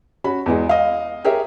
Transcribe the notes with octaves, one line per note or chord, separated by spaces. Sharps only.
C#4 F#4 B5
E2 E3 G#3
D#5 F5
G4 G#4 A#4 C#5 E5